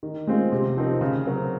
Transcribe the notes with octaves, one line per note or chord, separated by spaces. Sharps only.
D#3
G#3 C4 F4
C3
F3 C4 D#4 A#4
C#3
F#3 C4 F#4 A#4